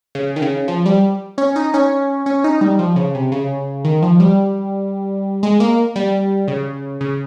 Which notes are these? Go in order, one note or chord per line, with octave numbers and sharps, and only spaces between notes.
C#3
D#3
C#3
F3
G3
C#4
D#4
C#4
C#4
D#4
G3
F3
C#3
C3
C#3
D#3
F3
G3
G#3
A#3
G3
C#3
C#3